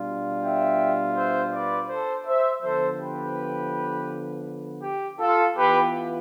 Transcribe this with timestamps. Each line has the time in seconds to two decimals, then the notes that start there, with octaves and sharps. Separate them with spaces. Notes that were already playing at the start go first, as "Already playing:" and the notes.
Already playing: B2 G3 D4 F4
0.43 E5 G5
1.16 C5 E5
1.53 B4 D5
1.89 A4 C5
2.26 C5 E5
2.63 D3 F3 B3 A4 C5
2.99 G4 B4
4.83 G4
5.19 F4 A4
5.56 E3 B3 F4 G4 B4